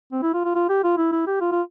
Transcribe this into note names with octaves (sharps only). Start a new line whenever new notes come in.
C4
E4
F4
F4
F4
G4
F4
E4
E4
G4
F4
F4